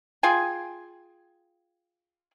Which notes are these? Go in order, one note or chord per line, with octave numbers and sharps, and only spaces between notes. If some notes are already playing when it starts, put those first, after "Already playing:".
F4 G#4 G5 G#5